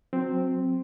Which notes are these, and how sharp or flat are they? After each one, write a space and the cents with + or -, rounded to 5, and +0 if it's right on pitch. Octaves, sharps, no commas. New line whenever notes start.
F#3 -25 C4 +0